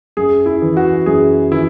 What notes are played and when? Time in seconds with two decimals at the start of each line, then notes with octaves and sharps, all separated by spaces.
0.17 F#2 G#4
0.46 E4
0.62 E3
0.77 F#4
1.06 F#2 G#4
1.51 E3 E4